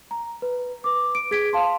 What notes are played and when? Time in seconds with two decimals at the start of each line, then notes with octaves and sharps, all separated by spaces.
0.11 A#5
0.42 B4
0.84 B4 D6
1.15 D7
1.31 G#4 G#6 B6 D7
1.53 F5 A5 C6